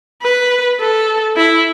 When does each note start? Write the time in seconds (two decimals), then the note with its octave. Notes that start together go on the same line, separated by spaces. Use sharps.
0.22 B4
0.80 A4
1.37 E4